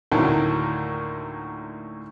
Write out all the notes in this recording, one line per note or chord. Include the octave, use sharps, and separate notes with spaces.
D2 A2 D#3 F#3 A#3